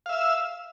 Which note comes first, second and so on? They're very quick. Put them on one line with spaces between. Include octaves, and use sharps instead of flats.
F5 E5 E6